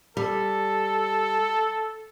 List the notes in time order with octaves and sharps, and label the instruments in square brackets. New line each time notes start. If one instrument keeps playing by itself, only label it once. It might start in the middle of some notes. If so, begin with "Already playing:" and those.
[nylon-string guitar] G3 [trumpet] A4